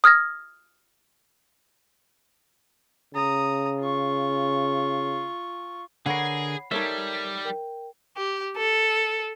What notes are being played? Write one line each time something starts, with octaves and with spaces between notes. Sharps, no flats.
D#6 F6 G#6 A#6
C#3 A#5 D#6
F4 C#6
D3 G#4 A#4 C#5 F#5 B5 C7
G3 D#4 A4 A#4 C#5 E5 G#6
A#4 G5
G4
A4